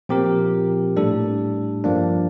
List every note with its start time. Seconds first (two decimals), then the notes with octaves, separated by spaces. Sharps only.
0.09 A#2 F3 C4 G4 A#4
0.96 A2 G3 D4 A4
1.84 G2 F3 A#3 D4